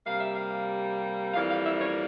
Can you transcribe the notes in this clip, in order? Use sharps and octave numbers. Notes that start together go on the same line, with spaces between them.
C3 G3 A#3 F5
E5
F5
F2 E3 G3 A#3 F5
F5
E5
C#5